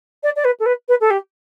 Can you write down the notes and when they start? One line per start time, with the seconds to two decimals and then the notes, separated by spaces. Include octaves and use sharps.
0.23 D5
0.36 D5
0.44 B4
0.59 A4
0.65 B4
0.88 B4
1.00 A4
1.10 G4